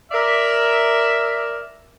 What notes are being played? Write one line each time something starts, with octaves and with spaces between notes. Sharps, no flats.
A#4 D5 E5